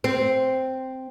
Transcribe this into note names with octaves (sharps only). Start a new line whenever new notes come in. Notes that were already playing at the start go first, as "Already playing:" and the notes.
C4